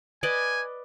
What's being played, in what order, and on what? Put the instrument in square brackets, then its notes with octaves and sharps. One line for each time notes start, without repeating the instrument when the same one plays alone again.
[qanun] B4 D5 D#5 [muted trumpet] G#5